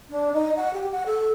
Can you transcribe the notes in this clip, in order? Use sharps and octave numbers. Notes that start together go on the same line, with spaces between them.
D4
D#4
F#5
G4
F#5
A4